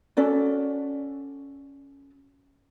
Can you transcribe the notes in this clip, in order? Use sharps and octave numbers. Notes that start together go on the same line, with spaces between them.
C#4 F#4 A4 D5